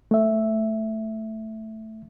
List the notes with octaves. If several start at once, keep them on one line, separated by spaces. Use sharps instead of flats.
A3 E5